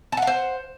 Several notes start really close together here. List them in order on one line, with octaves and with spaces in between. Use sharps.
A5 F#5 F5 C5